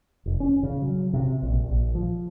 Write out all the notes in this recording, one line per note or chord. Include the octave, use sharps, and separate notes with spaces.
F1
C#4
C#3
F#3
C3
A#1
A#1
F3